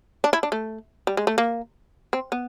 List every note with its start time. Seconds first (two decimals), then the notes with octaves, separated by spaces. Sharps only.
0.24 D4
0.33 E4
0.43 D4
0.52 A3
1.07 G3
1.17 G#3
1.27 A3
1.38 A#3
2.13 C4
2.32 B3